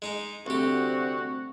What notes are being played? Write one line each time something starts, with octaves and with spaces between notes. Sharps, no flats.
G#3 D#4 A#5
D2 C3 G3 C4 F#4 G4